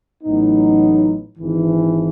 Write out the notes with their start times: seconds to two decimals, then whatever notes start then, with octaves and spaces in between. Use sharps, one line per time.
0.24 A1 A2 F#3 B3 D#4
1.38 G#1 G#2 E3